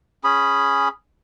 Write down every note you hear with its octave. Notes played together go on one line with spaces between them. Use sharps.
C#4 G#4 B5